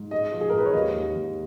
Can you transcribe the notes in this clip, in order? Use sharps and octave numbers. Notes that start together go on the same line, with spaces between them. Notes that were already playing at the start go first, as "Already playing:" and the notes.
Already playing: G#2
G#3 D#5
F3
G#4
A#4
G#2
B4
C#5
D#2 D#5
D#2
D#2